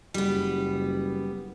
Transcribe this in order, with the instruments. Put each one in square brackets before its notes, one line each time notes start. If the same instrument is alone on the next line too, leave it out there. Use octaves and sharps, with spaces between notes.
[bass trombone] F#1 [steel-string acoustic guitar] G3 B3